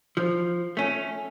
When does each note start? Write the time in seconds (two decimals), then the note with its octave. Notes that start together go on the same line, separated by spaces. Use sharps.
0.17 F3
0.77 A3 C#4